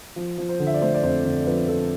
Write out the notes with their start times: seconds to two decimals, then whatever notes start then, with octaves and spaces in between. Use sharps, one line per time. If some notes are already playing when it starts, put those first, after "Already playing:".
0.16 F3
0.38 F3
0.49 C5
0.60 D3
0.67 E5
0.74 D5
0.81 A3 C5
0.94 D5
1.03 F2 C5
1.25 D3
1.47 F3 B4
1.68 F3 A4